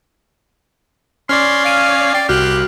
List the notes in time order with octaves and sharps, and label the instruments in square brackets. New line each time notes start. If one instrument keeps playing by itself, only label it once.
[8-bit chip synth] C#4 C#5 D5 [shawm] C6 [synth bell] F6
[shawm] F5 [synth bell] G#6 D7 D#7
[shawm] D5 [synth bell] G5 C7
[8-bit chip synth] C2 F#6 [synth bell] F#4 F6 [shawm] G4